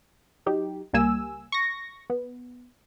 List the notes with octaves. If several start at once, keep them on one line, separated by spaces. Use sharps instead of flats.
F#3 D#4 G4
C#2 G3 A#3 G#5 E6
C#6 A#6
B3